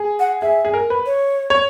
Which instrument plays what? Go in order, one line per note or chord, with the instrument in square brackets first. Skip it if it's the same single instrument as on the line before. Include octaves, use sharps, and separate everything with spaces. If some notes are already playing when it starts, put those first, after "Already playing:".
Already playing: [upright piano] G#4
[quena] F#5
[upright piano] G#4 [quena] E5
[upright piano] G#4
A#4
B4
[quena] C#5
[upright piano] C#5